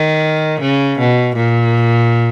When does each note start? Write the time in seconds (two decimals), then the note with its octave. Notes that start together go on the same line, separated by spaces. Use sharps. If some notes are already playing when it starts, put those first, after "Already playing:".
Already playing: D#3
0.61 C#3
0.99 B2
1.36 A#2